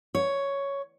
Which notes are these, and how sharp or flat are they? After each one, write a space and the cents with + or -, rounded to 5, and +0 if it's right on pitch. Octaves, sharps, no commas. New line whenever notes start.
C#5 +5